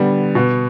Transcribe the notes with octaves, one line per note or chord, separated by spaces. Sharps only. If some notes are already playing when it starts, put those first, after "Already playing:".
Already playing: D3 G3 B3
B2